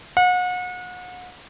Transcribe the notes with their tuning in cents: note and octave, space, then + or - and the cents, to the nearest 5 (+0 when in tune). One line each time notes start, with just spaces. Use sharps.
F#5 -35